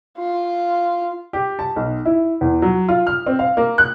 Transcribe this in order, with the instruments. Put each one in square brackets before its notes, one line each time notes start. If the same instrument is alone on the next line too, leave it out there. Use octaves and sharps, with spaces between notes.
[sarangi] F4
[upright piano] G4
A5
B1
E4
E2
F#3
F4
F6
C4
F5
A#3
F#6